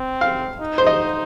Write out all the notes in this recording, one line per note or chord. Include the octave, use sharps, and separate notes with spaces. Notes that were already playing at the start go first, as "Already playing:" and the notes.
Already playing: C4
F5
D#4
C5
D#5